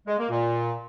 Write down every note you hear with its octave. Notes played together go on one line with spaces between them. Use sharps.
G#3
A#3
A#2